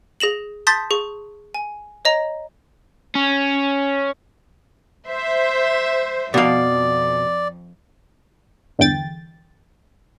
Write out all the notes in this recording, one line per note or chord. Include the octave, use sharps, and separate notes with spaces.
G#4 A#6 E7 F#7
A5 C6 D#6 G6 A6 B6
G#4 C#6
G#5
C#5 D#5 A#5
C#4
C5 E5
F2 B2 D5 F5
G1 E2 D3 G5 A6